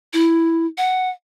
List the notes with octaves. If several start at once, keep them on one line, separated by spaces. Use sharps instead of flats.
E4
F#5